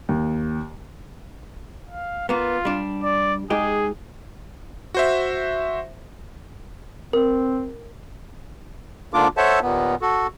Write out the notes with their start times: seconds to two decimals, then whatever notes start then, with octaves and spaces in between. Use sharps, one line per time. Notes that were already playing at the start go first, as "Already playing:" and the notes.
0.09 D#2
1.89 F5
2.29 A#3 B3 F4
2.65 G3 D4
3.03 D5
3.50 G#3 D#4 G4 G#4
4.94 F#4 C5 E5
7.13 C4 A#4
9.14 G#2 D3 A#3 D4 F4 D6
9.37 A4 C5 C#5 E5 F#5 A5
9.62 D#2 A#2 B3
10.02 F#4 A4